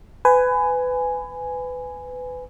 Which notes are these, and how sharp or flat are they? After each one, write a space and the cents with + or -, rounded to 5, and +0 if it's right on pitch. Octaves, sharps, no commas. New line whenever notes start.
B4 +25 G#5 +0